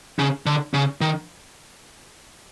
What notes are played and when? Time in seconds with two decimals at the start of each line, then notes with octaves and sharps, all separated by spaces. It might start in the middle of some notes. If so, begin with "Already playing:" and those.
0.19 C#3
0.46 D3
0.74 C#3
1.01 D#3